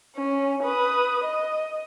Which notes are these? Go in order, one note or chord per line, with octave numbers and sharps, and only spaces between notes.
C#4
B4 D#6
D#5